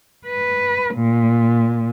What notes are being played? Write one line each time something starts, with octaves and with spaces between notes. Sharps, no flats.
B4
A#2